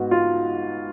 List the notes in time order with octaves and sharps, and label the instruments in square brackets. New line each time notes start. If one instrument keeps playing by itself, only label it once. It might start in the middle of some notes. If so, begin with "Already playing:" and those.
Already playing: [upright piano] G#2 B3 F#4
F4